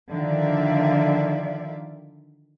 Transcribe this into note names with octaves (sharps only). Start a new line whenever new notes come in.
D3 D#3 F3 D5 E5 F5